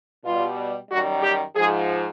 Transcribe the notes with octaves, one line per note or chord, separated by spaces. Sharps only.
B2 G3 F4
F#2 D#3 G3 F#4
G4
G#2 F3 G#4